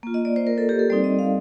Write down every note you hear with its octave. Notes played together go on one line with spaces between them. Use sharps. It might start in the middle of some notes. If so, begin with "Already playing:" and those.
A#3 F4
D#5
D5
C5
A#4
A4
G4
A4
G3 C4 D#4 D5
D#5
F5